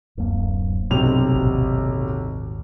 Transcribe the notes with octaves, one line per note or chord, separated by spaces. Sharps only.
D1 F#2 A#3
B1 G2 C3 F7
G#1 D#2 A#2